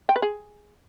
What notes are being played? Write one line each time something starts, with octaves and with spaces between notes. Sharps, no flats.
G5
B4
G#4